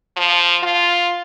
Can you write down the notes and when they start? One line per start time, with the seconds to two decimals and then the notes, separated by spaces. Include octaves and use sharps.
0.16 F3
0.63 F4